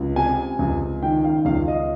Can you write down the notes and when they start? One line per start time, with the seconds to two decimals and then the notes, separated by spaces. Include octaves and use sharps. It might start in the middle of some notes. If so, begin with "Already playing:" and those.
Already playing: C#2
0.16 C3 G#5
0.59 C#2
1.02 D#3 G5
1.24 F5
1.45 C#2 F5
1.68 D#5